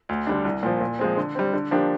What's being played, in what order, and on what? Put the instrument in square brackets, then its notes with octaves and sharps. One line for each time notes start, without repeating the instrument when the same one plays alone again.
[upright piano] D2
D3 G3 D4
C2
A#2 F3
A#2
F3 G#3 C4
D3
G3 C4
D3
F3 A#3 D4 G4